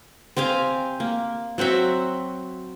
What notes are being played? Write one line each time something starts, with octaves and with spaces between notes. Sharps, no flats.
C4 G4 F5 G#5
A#3
F#3 C4 F#4 E5